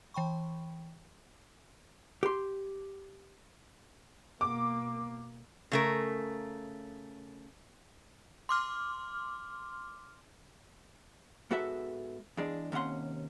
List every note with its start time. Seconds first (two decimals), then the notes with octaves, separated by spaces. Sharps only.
0.14 E3 G5 B5 C#6
2.23 G4 C6
4.41 B2 A#3 D6
5.72 C#3 A3 A#4
8.49 C6 D6 F6
11.51 G#2 B3 F#4 A4 E5
12.37 E2 G#3 D4
12.72 D#2 C3 C#4 F#5 C6